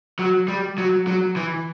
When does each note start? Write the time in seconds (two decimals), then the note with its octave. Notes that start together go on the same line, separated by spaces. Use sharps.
0.19 F#3
0.48 G3
0.78 F#3
1.07 F#3
1.36 E3